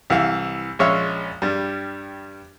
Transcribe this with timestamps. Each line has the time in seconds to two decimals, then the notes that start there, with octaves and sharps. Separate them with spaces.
0.10 C2 E3 F5
0.79 A#1 G#3 C#4 C#5 E5 F5
1.42 G2 G3